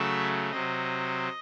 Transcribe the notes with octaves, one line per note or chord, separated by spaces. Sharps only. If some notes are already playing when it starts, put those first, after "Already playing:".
Already playing: C#3 F#3 A3 E5
C3 F#3 C4 D#5